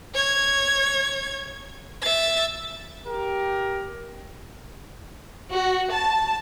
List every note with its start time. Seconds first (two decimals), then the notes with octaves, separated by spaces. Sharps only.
0.15 C#5 G#6
2.02 E5 A6
3.07 G4 A#4
5.51 F#4
5.92 A5